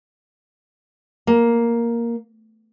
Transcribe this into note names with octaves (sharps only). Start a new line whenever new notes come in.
A#3